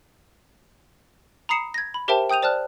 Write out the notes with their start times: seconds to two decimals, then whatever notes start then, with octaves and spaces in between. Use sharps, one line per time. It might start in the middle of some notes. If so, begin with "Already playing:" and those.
1.49 A#5 B5 D#6 C7 C#7 E7
1.74 G#6 A#6
1.94 B5
2.08 G4 A#4 C5 E5 G5 A5
2.30 G5 D#6 G6 D#7 F7
2.42 C5 D5 A5 F6 F#6